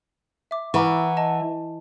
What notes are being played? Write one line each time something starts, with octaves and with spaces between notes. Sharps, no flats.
E5 D6
E3 E4 A#4 F#5 C#6 D6
D#5 A5